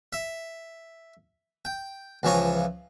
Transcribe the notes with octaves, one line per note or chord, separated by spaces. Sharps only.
E5
G5
C#2 E3 F3 C#5 A#5